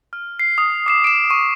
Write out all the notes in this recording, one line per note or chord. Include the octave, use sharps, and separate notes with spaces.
F6
C7
D#6
D6 C7 E7
D7 E7
C#6